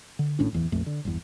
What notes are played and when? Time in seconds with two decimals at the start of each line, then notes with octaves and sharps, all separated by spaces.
0.19 D3
0.39 G#1 A2 C#4 D4
0.53 D1 E2 E3
0.72 A#1 F2 A3
0.86 D3
1.05 G1 E2